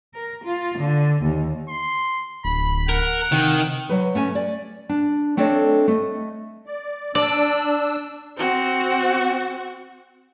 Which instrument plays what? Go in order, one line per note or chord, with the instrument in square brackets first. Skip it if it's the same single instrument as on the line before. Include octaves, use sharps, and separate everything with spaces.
[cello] A#4
F4
D3
D#2
[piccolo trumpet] C6
[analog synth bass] D1 [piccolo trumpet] B5
[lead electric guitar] A#4 [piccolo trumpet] F#5
[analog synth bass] C3 [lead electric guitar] D#3
[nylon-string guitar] F#3 B4
A3 C#4 G#5
D5
D4
A3 C4 D4 A4 C#5 D#5
A3 D#5
[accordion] D5
[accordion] D4 E6 [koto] D5
[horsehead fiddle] C4 F#4